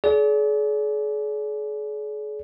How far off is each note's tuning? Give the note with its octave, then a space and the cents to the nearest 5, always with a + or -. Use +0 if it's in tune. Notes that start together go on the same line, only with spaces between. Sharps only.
G#4 +40 D5 -35